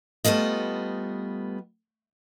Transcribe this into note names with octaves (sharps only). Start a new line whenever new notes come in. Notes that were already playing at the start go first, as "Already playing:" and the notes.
G3 A3 B3 F4 D#5